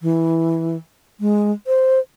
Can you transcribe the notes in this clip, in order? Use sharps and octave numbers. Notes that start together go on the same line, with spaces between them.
E3
G#3
C5